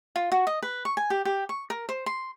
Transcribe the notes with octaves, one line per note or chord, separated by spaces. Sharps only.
F4
F#4
D#5
B4
C#6
G#5
G4
G4
C#6
A#4
C5
C6